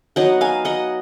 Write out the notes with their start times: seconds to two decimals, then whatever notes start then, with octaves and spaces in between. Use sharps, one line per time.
0.16 F#3 B3 D#4 D#5 F#5
0.41 F5 G#5
0.65 D#5 F#5